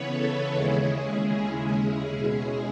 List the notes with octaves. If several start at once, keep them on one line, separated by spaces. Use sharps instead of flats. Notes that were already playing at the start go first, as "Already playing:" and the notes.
Already playing: C#3 E3 B3 B4 C#5
A4
D#2 C#3 G#3 C#4 E4 G#4
B2 G#3 C#4 E4 G#4